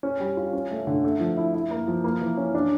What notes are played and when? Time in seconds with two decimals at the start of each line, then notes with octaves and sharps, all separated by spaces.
0.03 C#4
0.20 G3
0.37 F4
0.53 C#4
0.71 A3
0.87 D3
1.04 A3
1.20 F3
1.37 E4
1.54 E4
1.71 A#3
1.88 F3
2.04 A#3
2.21 E3
2.37 C#4
2.54 D4